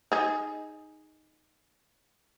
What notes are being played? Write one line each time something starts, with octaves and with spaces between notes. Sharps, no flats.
D#4 G#4